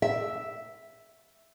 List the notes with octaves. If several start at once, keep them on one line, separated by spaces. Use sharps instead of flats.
E5